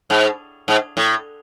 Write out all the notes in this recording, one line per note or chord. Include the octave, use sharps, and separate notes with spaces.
G#2
G#2
A2